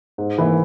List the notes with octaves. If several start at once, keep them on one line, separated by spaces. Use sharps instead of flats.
G#2
E3 A#3 E4